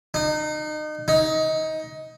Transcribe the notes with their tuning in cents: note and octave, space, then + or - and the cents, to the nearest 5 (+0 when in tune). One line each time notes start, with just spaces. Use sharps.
D#4 -30
D#4 +20